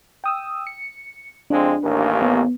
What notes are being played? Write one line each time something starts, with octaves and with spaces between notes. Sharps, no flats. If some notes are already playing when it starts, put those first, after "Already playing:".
G5 D#6 E6
C#7
F2 G#3 C4 D4
A1 D#2 A#3
B3